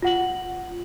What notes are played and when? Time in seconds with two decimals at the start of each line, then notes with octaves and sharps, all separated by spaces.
0.02 F4 F#5 F#7